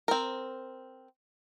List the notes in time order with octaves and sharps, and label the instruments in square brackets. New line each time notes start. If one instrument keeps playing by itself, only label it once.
[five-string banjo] C4 A#4